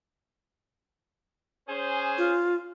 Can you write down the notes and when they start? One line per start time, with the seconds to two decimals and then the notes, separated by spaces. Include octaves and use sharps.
1.68 C#4 G#4 C5
2.18 F4